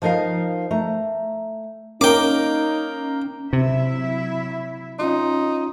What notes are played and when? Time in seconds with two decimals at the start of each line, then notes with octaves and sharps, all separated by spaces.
0.02 F3 D#4 A#4 D#5 F5
0.71 A3 A#5
2.01 A#3 C#4 D#4 A#4 G5 D6
3.53 C3 F#3 E4 E5
4.99 C#4 D#4 F4 C6